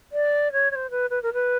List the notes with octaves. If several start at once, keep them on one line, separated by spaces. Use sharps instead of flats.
D5
C#5
C#5
C5
B4
B4
A#4
B4